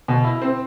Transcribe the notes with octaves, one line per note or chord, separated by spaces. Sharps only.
B2
E4
C4